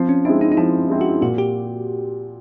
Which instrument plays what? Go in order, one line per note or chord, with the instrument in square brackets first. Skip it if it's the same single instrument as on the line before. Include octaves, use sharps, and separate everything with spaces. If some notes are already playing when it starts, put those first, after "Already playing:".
Already playing: [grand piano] F3 [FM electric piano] C4
[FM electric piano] C#4
[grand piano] G#3 C4 E4 [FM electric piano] D4
[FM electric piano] D#4
D#4
[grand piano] F3 [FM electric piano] E4
[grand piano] G#3 C4 E4
[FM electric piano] F#4
[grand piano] A#2 [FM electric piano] F#4
[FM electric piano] G4